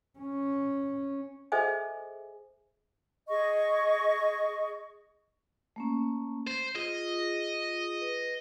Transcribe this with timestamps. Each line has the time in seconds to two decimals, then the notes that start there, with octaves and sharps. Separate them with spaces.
0.19 C#4
1.52 G#4 A4 C5 D#5 E5 G#5
3.27 G#4 D#5 C#6
5.76 A3 A#3 C#4
6.47 C5
6.75 F4 G#4 D#5
8.01 B4